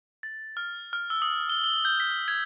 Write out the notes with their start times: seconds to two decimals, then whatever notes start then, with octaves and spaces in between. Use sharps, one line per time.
0.23 A6
0.57 F6
0.93 F6
1.10 E6
1.22 D#6
1.50 G7
1.64 G7
1.85 G6
2.00 B6
2.28 G#6